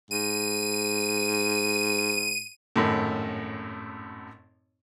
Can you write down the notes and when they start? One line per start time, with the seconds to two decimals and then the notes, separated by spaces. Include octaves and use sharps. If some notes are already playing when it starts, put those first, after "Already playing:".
0.11 G#2 D#7
2.76 G#1 F#2 A2